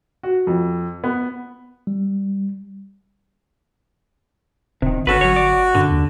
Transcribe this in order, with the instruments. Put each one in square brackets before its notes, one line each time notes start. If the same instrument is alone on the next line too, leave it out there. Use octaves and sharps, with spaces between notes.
[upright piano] F#4
F2
B3
[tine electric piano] G3
[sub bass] D1 [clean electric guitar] C3 D#3
[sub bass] G1 [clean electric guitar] C#4 A4 B4 [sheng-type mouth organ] F#4
[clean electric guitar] F#3 C#5
D5
[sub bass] F#2 [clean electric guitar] D3
[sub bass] D#2